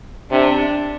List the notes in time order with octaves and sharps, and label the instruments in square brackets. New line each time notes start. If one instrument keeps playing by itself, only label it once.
[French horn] C3 [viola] D4